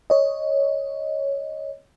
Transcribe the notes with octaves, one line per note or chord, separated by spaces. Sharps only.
C#5 D#5